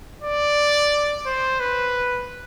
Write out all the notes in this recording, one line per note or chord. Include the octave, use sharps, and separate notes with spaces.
D5
C5
B4